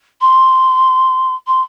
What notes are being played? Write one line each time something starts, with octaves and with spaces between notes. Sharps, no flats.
C6
C6